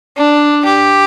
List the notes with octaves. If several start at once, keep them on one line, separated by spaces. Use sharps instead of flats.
D4
G4